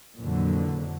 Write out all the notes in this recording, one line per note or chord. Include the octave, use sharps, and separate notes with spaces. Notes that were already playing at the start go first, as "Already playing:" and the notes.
F2 A#2 D3 E3 F#3